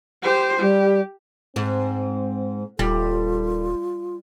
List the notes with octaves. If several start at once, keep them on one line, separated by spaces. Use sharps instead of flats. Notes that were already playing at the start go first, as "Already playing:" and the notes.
G4 C5
G3 G4
G#2 C4
D#1 G3 F4 A4